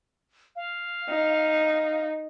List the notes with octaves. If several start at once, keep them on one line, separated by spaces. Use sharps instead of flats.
F5
D#4